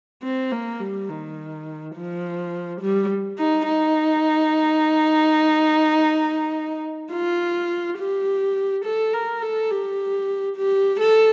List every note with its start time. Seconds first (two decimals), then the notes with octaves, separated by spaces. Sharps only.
0.23 C4
0.52 A#3
0.80 G3
1.09 D#3
1.95 F3
2.81 G3
3.38 D#4
3.67 D#4
7.12 F4
7.98 G4
8.85 A4
9.13 A#4
9.42 A4
9.70 G4
10.56 G4
11.00 A4